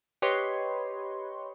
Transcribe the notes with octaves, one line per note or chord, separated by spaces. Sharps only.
G4 B4 C#5 D#5 C6